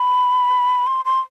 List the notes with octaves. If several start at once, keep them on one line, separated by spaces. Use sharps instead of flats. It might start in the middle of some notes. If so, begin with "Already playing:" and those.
Already playing: B5
C6
C6